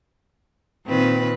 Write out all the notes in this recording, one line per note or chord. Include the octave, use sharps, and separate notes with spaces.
A#2 D#3 C4 B4